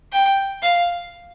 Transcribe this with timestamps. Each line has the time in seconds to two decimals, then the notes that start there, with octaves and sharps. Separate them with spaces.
0.12 G5
0.62 F5